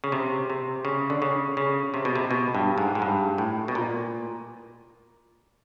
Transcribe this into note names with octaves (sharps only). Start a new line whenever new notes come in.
C#3
C3
C3
C#3
D3
C#3
C#3
C3
B2
C3
B2
G2
G#2
G#2
G2
A2
B2
A#2